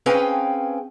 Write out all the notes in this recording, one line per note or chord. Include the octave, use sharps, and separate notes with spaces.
C4 C#4 G#4 B4 F5 G5